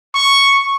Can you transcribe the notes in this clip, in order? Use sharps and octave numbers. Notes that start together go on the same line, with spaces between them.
C#6